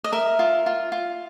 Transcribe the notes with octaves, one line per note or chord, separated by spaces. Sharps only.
D#5
A#4 E5
F4
F4
F4